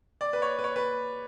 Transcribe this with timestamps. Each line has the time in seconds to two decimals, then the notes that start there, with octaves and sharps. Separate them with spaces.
0.21 D5
0.33 B4
0.42 C#5
0.59 B4
0.64 C#5
0.76 B4